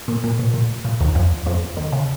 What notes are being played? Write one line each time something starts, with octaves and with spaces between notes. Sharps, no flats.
A#2
A#2
A#2
A#2
A#2
D#2 D#3
F2 F3
F2 F3
D#2 D#3
C#3